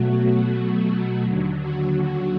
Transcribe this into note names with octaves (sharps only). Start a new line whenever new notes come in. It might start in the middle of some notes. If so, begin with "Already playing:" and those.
Already playing: B2 F#3 A3 F#4
F#4
D#2 D3 F#3
F#4